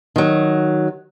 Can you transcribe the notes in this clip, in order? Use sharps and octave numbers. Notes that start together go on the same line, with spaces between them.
D#3 F#3